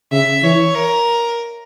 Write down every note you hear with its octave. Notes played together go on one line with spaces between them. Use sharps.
C#3 E5
E3 C#5
A#4